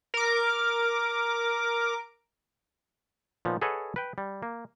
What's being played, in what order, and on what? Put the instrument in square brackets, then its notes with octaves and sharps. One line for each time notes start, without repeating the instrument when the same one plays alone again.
[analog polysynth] A#4 D6
[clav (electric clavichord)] A#2 F3 B3 D#4
G#4 A4 B4 C#5 D#5 F#5
B4 G5
G3
A#3